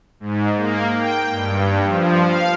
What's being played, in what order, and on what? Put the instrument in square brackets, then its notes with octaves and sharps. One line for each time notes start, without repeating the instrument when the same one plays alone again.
[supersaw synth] G#2
A#3
G5
G2
F3
F5